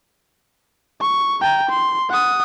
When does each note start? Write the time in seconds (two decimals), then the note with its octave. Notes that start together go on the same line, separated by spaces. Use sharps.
1.01 C#6
1.41 G5 A#5
1.70 C6
2.10 F#5 D#6